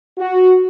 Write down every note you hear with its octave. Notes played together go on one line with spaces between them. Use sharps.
F#4